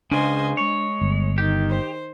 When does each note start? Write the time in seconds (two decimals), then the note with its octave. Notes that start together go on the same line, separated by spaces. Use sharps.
0.11 C#2 C#3 D4 C5 D#5 G#5
0.57 G#3 C#5
1.01 G1
1.38 D#3 G4
1.69 C5